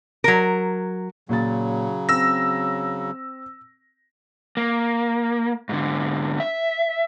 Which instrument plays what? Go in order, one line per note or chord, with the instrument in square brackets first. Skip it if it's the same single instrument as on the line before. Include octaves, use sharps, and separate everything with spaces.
[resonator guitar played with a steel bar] F#3 A#4
[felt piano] A#2 A6 [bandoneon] C#3 F#3
[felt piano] C4 [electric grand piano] E6 A#6
[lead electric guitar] A#3
G#2 D3
E5